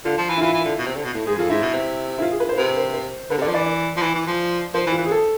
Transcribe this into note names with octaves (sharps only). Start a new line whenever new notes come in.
D3 F4
F3
E3
E4
E3 F4
E3
D3
B2
C3
D3
B2
A2
G#2 G#4
F2 F4
G#2 E4
B2
C3
E4
F4
G#4
B4
C5
C3 B4
C5
C5
D3 B4
C3
D3 D5
F3
E3 D5
D5
F3
E3
E3
F3
F3 C5
E3
F4
E3
G#4
A4